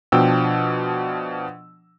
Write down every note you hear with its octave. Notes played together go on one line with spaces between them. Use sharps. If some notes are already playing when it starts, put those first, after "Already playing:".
B2 F3 D4 G5 E6